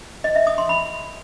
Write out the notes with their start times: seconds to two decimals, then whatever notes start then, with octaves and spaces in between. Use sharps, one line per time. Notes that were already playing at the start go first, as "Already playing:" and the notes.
0.24 D#5
0.35 E5
0.47 D#6
0.58 C6
0.69 B5